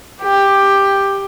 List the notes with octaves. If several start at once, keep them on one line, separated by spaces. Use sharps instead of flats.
G4